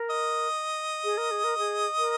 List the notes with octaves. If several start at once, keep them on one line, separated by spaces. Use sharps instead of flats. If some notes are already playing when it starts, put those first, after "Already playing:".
Already playing: A#4
D#5
G#4
A#4
G#4
A#4
G#4
A#4